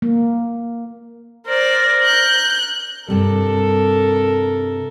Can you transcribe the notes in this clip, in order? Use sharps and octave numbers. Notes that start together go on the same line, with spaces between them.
A#3
A#4 C5 D5
F#6 G6
G2 C3 G3 A4 A#4